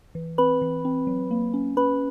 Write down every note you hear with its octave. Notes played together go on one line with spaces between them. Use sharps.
E3
C4 B4 B5
E3
C4
F#3
A#3
C#4
C#4 B4 B5